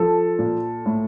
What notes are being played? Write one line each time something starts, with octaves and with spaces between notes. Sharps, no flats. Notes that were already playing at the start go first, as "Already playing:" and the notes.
Already playing: F3 A4
A#2
A2